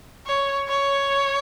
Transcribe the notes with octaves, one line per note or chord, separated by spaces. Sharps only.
C#5
C#5